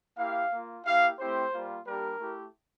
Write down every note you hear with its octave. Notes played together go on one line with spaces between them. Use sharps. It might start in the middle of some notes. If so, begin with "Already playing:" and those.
A#3 E4 G4 F5
A#3 F4
A#3 E4 G4 F5
A3 C4 E4 G4 C5
G3 A#3 F4
G3 A#3 D4 G4 A#4
A3 E4 G4